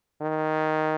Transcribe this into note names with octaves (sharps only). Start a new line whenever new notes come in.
D#3